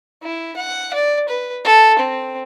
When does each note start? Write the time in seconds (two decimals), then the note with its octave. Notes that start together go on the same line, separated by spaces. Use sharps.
0.23 E4
0.56 F#5
0.93 D5
1.28 B4
1.65 A4
1.99 C4